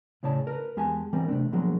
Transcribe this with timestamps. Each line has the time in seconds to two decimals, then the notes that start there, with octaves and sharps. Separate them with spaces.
0.23 A2 C#3 C#5 D5 A5
0.47 A#4 B4
0.77 E2 G#3 G4 G#5 A5
1.13 E3 G3 C4 A#4
1.28 C3 A3 C4 D4
1.52 B2 D3 F3 F#3 G#3 A#3